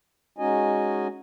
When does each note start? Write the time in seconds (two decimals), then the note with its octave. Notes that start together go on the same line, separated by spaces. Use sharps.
0.38 G#3 C#4 D#4 F#4 D#5 G#5